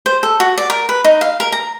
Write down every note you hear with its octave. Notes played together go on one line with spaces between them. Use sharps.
C5
A4
F#4
D5
A#4
B4
D#4
F5
A#4
A#5